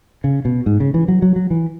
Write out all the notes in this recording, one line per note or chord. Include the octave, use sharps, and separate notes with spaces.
C#3
B2
G#2
C#3
E3
F#3
F#3
F#3
E3